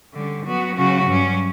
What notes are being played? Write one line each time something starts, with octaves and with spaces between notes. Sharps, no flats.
D3 G3 C#4
F#3 B3 F#4
C#3 F#3 C#4 F#4
G2 F#3 C#4